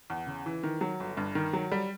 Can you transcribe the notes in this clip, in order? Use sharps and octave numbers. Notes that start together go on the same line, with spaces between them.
E2
C#3
E3
D#3
F#3
G1
G2
D#3
F#3
G3